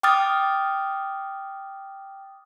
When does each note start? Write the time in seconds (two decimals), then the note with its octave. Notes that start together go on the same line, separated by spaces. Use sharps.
0.03 G5 D6 D#6 F6 A6